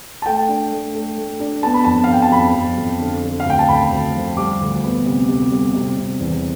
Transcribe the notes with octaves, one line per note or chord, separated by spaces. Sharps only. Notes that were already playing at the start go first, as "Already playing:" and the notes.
A5
A3 G5
D4
A3
A3
A3
D4
B3 A5
B5
F2 A5
F5
F2 G5
A5
F2 B5
F2
F2
D3
D3
F5
D2 G5
A5
D2 B5
D2
F3
G3 D6
D2
B3
C3
C3
G3
C3
C3
E2